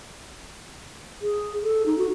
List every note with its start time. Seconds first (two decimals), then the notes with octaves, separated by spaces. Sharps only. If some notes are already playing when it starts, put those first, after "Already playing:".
1.22 G#4
1.63 A4
1.86 D#4
1.98 F#4